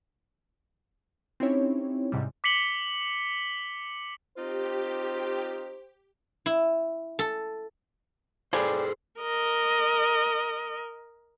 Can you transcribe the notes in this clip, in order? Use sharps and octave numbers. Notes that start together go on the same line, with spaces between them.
C4 C#4 D#4 E4 G4 C#5
G#2 C3 G3
D6 B6 C#7 F#7 G7
C4 D#4 F4 G4 C5
E4
A4
G3 G#4 A4 C5 G#5
A#4 D#5